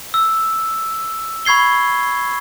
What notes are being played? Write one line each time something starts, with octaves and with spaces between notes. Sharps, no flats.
E6
B5 C#6 G#6 C7 G7